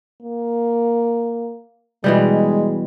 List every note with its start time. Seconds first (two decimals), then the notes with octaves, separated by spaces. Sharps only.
0.22 A#3
2.04 B2 E3 G3 G#3